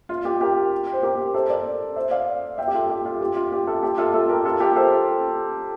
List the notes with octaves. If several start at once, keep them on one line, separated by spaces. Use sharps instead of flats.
F4
G4
G4 A#4
C5
G4 A#4
A4 C5
A#4 D5
C5 E5
D5 F5
E5 G5
G4
F4 A4
G4
F4
G4
F4
G4
F4 A4
G4
F4 A4
F4 A4
G4 A#4
F4 A4
G4 A#4
A4 C5